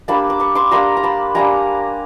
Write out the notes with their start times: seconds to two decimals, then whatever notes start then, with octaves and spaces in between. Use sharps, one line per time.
0.08 G3 A#3 D4 A5 B5
0.30 D6
0.40 B5 C#6
0.55 C6 D6
0.71 G3 A#3 D4 A#5 C6
0.97 A#5
1.03 A5 B5
1.35 G3 A#3 D4 G#5 A#5